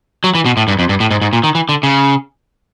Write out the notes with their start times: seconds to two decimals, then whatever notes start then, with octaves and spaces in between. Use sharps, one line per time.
0.24 F#3
0.35 E3
0.46 B2
0.57 A2
0.68 G2
0.79 F2
0.89 G2
1.00 A2
1.11 G#2
1.22 G#2
1.33 A#2
1.44 D#3
1.55 E3
1.69 D3
1.83 C#3